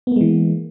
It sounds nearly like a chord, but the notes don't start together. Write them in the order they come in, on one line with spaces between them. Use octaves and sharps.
B3 A#3 G#3 E3